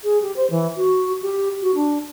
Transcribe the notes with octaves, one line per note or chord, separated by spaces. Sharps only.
G#4
G4
C5
E3
F#4
G4
F#4
D4